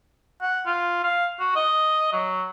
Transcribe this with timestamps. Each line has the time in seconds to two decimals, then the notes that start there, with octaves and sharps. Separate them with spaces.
0.41 F#5
0.66 F4
1.04 F5
1.39 F#4
1.55 D#5
2.12 F#3